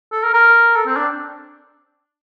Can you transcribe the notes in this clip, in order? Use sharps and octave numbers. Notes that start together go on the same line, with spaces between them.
A4
A#4
A#4
A4
C4
D4